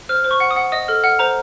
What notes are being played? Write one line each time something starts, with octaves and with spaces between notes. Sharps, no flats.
C5 F6
C5
C#6
F#5
D#6
F#5
D#5 D#6
A4 F6
F#5 F6
C5 A#5